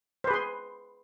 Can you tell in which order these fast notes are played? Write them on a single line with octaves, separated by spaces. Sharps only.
C5 B4 G#4 C6